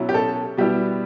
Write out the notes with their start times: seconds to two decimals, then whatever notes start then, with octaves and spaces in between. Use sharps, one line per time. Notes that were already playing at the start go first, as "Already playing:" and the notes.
Already playing: B2 F#3 C#4 E4
0.09 G4
0.14 A4
0.57 B2 G3 B3 E4 G4